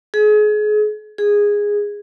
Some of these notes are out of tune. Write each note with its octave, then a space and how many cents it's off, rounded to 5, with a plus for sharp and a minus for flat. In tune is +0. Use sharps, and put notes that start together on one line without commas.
G#4 +30
G#4 -10